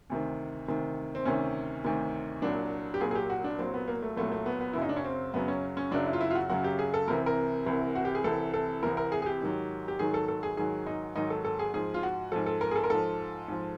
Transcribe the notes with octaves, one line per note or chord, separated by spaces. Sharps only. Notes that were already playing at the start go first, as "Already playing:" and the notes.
D2 C3 D#3
D2 C3 D#3
C4
D2 C3 D#3 C#4
D2 C3 D#3
C2 A#2 F#3 D4
G4
C2 A#2 F#3 G#4
G#4
G4
F#4
D4
C2 A#2 F#3 C4
B3
A#3
A3
C2 A#2 F#3 A3
A3
B3
B3
F#2 C#3 F#3 E4
D#4
D4
C#4
C4
F#2 C#3 F#3 B3
C#4
C#4
F#2 C#3 F#3 D4
E4
F4
E4
F4
F#4
F#2 C#3 F#3 F#4
G4
G#4
A4
C2 C3 E3 A#4
A#4
C2 C3 E3
F#4
G4
G#4
C2 C3 E3 A4
A4
C2 C3 E3 A#4
A#4
G#4
G#4
G4
G#2 D#3 F#3
G4
G#2 D#3 F#3 G#4
A4
A4
G#4
G#2 D#3 F#3 G#4
D#4
G#2 D#3 F#3 D#4
A4
A4
G#4
G#2 F3 G#4
F4
F#4
G#2 F3 A4
A4
A#4
G#4
A4
A#4
G#2 F3 A4
G#2 F3